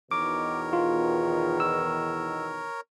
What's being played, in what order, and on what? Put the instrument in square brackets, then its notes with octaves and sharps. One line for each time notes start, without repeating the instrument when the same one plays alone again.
[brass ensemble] E2 B2 D#3 [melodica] A#4 C#5 [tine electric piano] D6
[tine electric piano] F4
E6